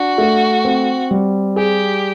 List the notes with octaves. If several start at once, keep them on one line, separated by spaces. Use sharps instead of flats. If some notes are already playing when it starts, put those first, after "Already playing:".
Already playing: D4 F#4
A3
C4
G3
G4 G#4